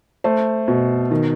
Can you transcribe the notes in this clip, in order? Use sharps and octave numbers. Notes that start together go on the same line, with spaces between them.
A3 C5
B2
D#3